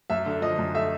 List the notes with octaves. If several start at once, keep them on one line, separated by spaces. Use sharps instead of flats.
F#2 E5
D3
F3 D#5
F#2
A3 E5